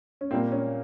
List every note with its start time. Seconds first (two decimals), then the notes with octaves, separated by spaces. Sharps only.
0.21 C#4
0.31 A#2 G3 A#3 C4
0.52 C#4